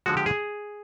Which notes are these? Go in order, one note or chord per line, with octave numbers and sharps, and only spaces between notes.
D3 F3 G#3 F#4
G4
G#4